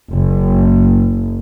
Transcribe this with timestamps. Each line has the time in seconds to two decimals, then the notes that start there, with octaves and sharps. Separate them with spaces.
0.13 F#1